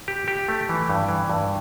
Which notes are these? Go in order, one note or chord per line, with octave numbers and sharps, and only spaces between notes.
G4
G4
A3
E3
G2
E3
G2